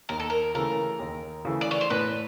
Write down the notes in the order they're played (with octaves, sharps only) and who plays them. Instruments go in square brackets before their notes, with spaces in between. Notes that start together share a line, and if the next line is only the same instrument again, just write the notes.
[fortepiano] D#2 [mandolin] A#4
[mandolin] A4
A#4
[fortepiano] C#3 E3 A3 [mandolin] A#4
[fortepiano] D#2
C#3 E3 A3
[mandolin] D5
C#5
C5
[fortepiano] A2 [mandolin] B4